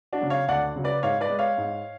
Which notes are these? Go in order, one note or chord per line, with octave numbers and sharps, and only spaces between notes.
D4 F#4
C#3 F#3
C#5 F5
D2 D5 F#5
C#3 F#3
B4 D5
G#2 C#5 F5
B4 D5
G#3
C#5 F5
G#2